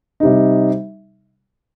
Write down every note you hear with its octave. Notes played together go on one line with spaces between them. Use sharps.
C3 G3 D#4